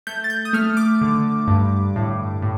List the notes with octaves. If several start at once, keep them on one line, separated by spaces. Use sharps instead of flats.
A3 G6
A6
G6
D#6
A3 F6
D6
D3
G2
A2
A2